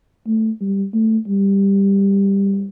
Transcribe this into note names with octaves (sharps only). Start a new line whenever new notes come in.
A3
G3
A3
G3